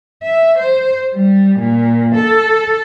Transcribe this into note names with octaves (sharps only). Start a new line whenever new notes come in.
E5
C5
G3
A#2
A4